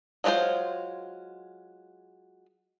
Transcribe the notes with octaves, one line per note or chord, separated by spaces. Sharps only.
F#3 G#3 D4 F4 C5